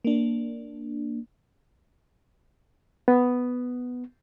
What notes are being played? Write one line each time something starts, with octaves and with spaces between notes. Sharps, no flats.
A#3 D4
B3